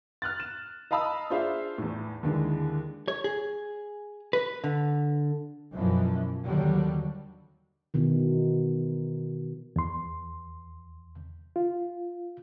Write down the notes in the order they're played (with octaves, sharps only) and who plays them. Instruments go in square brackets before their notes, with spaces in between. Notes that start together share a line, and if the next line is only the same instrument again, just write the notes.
[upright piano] F6 F#6 A6
E7
D#5 F5 A5 B5 D#6 E6
D4 F4 G#4 C5 E5 F5
E2 A2
D#2 D3 E3 G#3
[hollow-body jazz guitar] C#5
G#4
B4
D3
[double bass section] F#2 B2 E3 F3
D#2 D3 F#3 G3
[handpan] B2 D#3 E3
[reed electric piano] E2 C6
F4